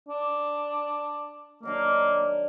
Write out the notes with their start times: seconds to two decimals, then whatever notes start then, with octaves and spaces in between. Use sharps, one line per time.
0.08 D4
1.63 D#3 F#3 A#3 D4